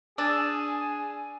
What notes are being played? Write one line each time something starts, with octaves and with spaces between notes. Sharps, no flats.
D4 G#4 G#5 E6 A6